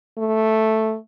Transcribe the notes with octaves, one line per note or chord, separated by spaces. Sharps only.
A3